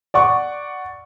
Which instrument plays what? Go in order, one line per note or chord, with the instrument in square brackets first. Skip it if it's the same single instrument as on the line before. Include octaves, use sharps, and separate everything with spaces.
[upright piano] D5 F#5 C#6